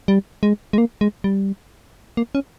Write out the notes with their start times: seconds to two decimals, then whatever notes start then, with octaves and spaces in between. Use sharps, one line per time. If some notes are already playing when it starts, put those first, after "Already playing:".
0.08 G3
0.43 G#3
0.73 G#3
0.78 A#3
1.01 G#3
1.24 G3
2.17 A#3
2.35 C#4